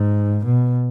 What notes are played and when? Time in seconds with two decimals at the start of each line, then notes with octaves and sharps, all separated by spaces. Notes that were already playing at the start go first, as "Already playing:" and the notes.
Already playing: G#2
0.45 B2